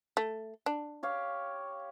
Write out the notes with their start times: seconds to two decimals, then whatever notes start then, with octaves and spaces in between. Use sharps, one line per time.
0.17 A3
0.66 D4
1.03 G4 C#5 F5